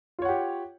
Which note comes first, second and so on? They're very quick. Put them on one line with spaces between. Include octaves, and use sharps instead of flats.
F4 C#5 F#5 G4